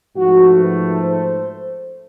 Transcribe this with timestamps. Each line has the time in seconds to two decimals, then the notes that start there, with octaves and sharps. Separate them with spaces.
0.16 G#2 F3 A3 F#4
0.57 B4
0.99 C5